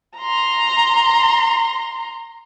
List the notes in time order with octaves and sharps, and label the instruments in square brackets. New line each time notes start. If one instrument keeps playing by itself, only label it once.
[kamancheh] A#5 C6